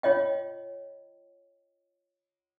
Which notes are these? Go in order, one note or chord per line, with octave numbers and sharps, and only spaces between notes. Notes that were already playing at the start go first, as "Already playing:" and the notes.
F4 C#5 D#5 G5